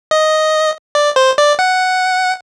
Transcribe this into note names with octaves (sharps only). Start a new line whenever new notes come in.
D#5
D5
C5
D5
F#5